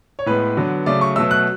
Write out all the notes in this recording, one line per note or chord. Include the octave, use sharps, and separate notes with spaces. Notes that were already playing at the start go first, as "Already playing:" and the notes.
C#5
A2 G#3 B3 B4
D3 F#3 B3
C#3 F#3 A3 D5
C#6
B2 F#3 A3 E6
F#6